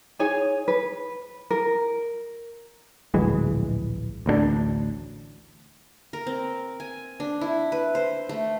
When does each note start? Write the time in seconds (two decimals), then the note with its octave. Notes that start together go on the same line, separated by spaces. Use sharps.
0.19 D#4 G#4 C#5 G#5
0.68 B4
1.50 A#4
3.14 D1 A#1 E3 G#3
4.26 A1 D2 A#3 D4
6.13 A#4
6.27 C4
6.80 G#5
7.20 D4
7.41 E4
7.72 B4
7.95 C5
8.29 A3